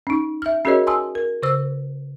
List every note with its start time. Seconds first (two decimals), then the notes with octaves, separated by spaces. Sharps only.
0.07 C#4 D#4
0.42 E5 F6
0.65 C#4 F#4 G#4 A#4 C#5 D#5
0.87 G#5 A5 C6 D#6 E6
1.15 A#4
1.42 C#3 C5 E6